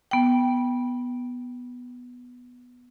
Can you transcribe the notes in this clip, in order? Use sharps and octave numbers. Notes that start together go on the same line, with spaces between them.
B3 G5